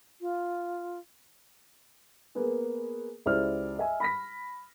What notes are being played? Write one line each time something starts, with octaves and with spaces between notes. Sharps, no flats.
F4
A#3 B3 G#4
C#2 E4 G4 C5 D5 F6
D#5 E5 G#5
B5 A#6 B6